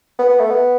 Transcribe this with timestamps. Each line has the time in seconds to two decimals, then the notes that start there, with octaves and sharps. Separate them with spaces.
0.19 B3
0.29 B3
0.39 A3
0.50 B3